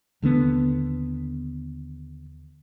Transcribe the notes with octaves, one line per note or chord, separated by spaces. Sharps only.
D#2 D3 A3 B3